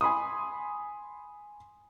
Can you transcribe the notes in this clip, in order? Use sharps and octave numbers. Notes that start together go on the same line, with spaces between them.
G#5 B5 C6 D#6